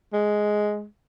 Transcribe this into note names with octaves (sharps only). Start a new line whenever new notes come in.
G#3